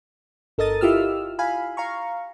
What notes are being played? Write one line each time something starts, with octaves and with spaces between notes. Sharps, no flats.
G1 A4 A#4 D#5 D#6 A6
E4 F4 G4 E6 F6
F5 G#5 B5
F5 A#5 C#6